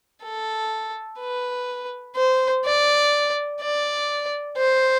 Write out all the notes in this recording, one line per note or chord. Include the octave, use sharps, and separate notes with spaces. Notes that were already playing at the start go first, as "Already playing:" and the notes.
A4
B4
C5
D5
D5
C5